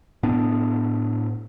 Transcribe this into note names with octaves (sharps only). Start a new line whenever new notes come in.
A2 B3 D4